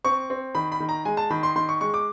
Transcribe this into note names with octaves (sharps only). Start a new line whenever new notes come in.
C4 C#6
C4
D#3 B5
B5
D#3
A#5
G#3 G#5
A5
D#3 B5
C6
D#3 C6
C#6
G#3 C#6
D6